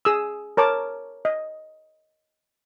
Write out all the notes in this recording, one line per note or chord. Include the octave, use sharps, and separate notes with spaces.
G#4 D#6 E6
A#4 C#5 A5 D6
D#5